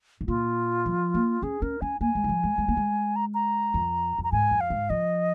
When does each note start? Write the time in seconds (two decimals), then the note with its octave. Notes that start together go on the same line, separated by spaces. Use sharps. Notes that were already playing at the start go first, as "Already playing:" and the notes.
0.21 G#2
0.27 A#2 F4
0.86 F3
1.14 A#3
1.42 C#4 G#4
1.62 C#4 A#4
1.81 C#4 G#5
2.01 A#3 G#5
2.15 G#3
2.24 D#3
2.29 F3
2.44 G#3
2.58 G#3
2.68 A#3
2.77 G#3
3.16 A#5
3.34 A#5
3.74 F2
4.18 F2
4.24 A#5
4.32 G#2 G#5
4.51 F2
4.61 F5
4.70 G#2
4.90 F3 D#5